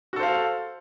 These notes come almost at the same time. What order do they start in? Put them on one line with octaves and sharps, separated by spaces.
F#4 A4 C5 F5